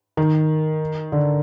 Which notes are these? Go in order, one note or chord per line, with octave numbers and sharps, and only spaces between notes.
D#3
D3